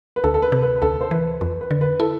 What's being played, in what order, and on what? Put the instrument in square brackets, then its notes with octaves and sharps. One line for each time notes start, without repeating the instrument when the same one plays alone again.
[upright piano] B4
[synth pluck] D2 [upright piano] A4
[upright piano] A4
B4
[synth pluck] C3
[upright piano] B4
B4
[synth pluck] D2 [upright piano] A4
[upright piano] C5
[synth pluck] E3 [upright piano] B4
[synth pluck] F2 [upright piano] B4
[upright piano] B4
[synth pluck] D3
[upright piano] B4
[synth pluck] E4 [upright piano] A4